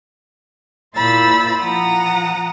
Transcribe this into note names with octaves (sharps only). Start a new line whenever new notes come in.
A#2 E4 C5 B5 E6 A6
F3 F#5 A#5 D#6